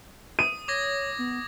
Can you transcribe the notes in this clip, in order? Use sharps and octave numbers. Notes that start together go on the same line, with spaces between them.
D#6 D#7
C#5 D6 G#6 A#6
B3